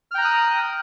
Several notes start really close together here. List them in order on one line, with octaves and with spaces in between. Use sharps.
F6 G5 A#5 F#6 D#6